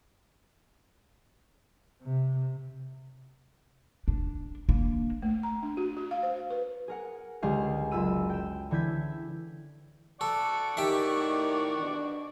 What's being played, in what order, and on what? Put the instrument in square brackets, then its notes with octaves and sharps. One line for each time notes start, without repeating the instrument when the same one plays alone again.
[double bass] C3
[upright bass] D4
A#3 D4
[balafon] A3
A#5
D4
F#4
F#4
F5
C5
B4
[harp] G#4 A#4 F#5
C#2 D3 G#3 G4 G#4 F5
F#1 F4 B5 E6 D#7
G5 E7
D3 E3 E4 G6 G#6 B6
[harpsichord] A4 [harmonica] D5 F#5 C#6
[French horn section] A2 D#3 [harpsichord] G4 E5
[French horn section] B2 D4